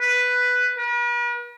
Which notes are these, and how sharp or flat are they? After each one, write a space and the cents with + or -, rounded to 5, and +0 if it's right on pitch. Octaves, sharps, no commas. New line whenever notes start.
B4 +5
B4 -45